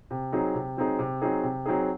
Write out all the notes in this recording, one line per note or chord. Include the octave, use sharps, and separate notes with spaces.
C3
F#3 C4 D#4 G#4
C3
F#3 C4 D#4 G#4
C3
F#3 C4 D#4 G#4
C3
F#3 C4 D#4 G#4